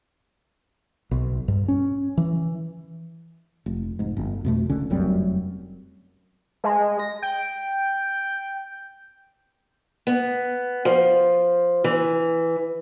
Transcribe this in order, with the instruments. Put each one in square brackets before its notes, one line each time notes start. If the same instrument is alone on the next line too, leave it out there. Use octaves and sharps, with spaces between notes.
[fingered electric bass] B1
G2
C#4
E3
[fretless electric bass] F1
F1 G#2
G1
F2 B2 A3
F1 C#2 D3 C#4
F1 F#2 G3 C4
[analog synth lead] G#3
A#6
G5
[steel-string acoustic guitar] B3
F3
E3